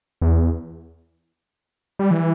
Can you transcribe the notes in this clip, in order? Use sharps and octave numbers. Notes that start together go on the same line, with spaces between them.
E2
G3
E3